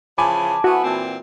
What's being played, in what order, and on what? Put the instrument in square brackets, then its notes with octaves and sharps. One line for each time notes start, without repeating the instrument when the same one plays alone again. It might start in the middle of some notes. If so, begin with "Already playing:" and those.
[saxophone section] C#3 E3 F3 [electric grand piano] G#5 B5 D6 [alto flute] A5
[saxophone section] F2 B3 E4 [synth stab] F#4
[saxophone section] A#2 E3 C4